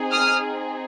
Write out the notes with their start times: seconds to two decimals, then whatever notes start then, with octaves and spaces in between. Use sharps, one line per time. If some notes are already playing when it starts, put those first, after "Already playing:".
Already playing: C4 D#4 G#4
0.12 D#6 F6